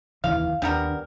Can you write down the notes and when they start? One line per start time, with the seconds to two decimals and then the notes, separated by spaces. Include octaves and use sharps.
0.24 F1 D#2 E3 F5
0.62 D#2 G3 B3 D4 A#4